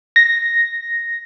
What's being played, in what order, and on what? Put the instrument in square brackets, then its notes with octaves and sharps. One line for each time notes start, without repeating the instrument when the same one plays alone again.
[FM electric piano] A#6